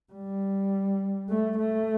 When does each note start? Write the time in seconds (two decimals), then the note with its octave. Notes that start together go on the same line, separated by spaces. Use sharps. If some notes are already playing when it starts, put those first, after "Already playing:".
0.12 G3
1.29 A3
1.58 A3